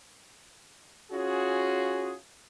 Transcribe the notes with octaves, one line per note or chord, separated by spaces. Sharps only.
C#4 F4 F#4 G#4